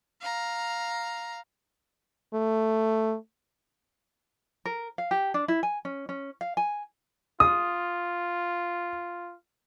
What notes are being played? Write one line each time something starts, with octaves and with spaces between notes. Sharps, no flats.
F5 A#5
A3
A#4
F5
G4
D4
E4
G#5
C#4
C#4
F5
G#5
F4 D#6